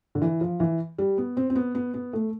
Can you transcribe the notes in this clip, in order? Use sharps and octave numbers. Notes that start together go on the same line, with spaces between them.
D3
E3
F3
E3
G3
B3
C4
C4
B3
B3
B3
A3